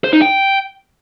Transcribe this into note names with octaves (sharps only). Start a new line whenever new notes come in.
C5
D#4
G5